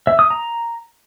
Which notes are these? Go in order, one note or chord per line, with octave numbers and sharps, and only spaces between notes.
E5
D#6
A#5